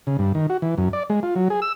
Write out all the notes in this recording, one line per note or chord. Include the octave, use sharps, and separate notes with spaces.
C#3
G2
D#3
F#4
E3
F#2
D5
G#3
F4
F#3
G#4
E6